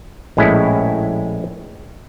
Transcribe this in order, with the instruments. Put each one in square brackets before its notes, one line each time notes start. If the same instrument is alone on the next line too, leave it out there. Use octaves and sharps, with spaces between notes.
[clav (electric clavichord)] A#1 A2 G#3 C#4 E4